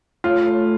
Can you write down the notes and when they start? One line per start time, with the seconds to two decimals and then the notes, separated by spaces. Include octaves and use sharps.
0.24 A2 F4
0.46 A2